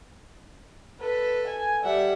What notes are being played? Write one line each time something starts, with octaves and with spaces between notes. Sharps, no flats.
A4 B4
G#5
G3 E5 F#5